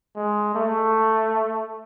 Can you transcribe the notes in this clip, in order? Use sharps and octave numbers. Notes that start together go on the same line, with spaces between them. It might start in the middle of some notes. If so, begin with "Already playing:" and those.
G#3
A3